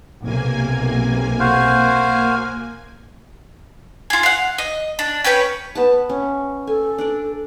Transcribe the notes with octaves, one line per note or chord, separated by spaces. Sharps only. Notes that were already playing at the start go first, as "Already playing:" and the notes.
B1 C3 A#3 G#5
F#4 C5 F5
F4 G#4
F5 F#5
D#5
D4
C#4 G4 B4 C#5
B3 B4 A5
C#4
A4 G#5
D4 D5